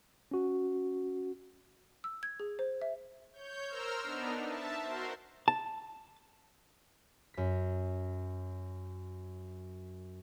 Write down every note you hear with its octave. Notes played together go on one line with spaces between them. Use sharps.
C#4 F#4
E6
G#6
G#4
C5
E5
C#5 G6
A#4 C5 A#5 E6 F6
B3 D4 D#4
E5 A5
F#4 A#4 C5 C6
A5
F#2 B6